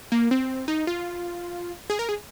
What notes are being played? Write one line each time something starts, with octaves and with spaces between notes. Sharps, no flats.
A#3
C4
D#4
F4
G#4
A#4
G#4